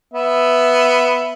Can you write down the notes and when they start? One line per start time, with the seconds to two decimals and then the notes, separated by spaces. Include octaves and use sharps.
0.14 B3 E5